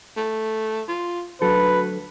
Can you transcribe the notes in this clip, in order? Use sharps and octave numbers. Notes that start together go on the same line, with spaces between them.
A3
F4
D2 F#3 A4 B4